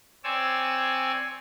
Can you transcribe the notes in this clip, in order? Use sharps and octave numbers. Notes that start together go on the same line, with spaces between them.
C4 C#5 D5 G#5 E6